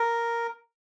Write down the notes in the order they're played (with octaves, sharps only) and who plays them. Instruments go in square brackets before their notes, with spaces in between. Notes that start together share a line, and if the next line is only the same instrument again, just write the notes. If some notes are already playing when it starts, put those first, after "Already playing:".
Already playing: [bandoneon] A#4